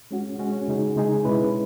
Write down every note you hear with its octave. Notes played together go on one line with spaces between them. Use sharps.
G#3 C#4 F#4
G#3 C#4 F#4
C#3 G#3 D#4 G#4
C#3 G#3 D#4 G#4
B2 G#3 C#4 E4 B4